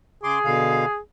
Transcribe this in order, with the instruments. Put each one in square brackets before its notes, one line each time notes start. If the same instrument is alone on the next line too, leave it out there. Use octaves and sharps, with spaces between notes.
[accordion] C#3 C6 D6 [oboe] G#4
[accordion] B2 D3 F5